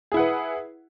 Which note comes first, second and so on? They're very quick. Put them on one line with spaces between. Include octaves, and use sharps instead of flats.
G#4 E4 F#5 B4